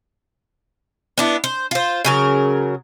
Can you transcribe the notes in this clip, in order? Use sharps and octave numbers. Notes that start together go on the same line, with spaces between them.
B3 D4 E4
C5
F4 C5
C#3 F#3 A#4